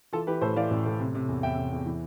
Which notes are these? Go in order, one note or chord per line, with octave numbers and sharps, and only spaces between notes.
E3 F4 A4
E3 G4 B4
A2 A4 C5
E3 D5 F5
A1
A2
C3
C3
E2
E2 E5 G5
C3
E2
E3